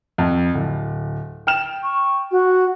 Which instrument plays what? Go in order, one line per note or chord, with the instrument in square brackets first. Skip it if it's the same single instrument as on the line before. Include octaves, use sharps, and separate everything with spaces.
[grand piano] F2
D1
G5 F6 E7
[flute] C#6
F#4